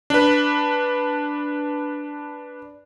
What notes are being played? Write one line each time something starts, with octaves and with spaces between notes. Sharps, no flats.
D4 B4